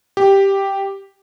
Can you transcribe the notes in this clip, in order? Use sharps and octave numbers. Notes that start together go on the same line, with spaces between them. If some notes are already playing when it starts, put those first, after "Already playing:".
G4